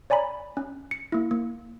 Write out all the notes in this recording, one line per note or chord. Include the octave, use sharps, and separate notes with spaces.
C#5 D5 G#5 A#5 B5
C#4
C#7
A#3 E4
A#3